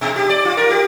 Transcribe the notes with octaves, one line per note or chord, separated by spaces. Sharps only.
B2
G4
D5
F4
A#4
G4